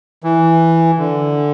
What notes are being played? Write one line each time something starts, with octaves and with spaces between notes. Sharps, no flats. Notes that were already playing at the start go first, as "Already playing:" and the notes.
E3
D3